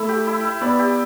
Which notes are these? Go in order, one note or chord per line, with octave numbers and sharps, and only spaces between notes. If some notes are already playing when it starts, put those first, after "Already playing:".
Already playing: A3 E4 A4
G4
E4
E4
B3 B4 D5
G4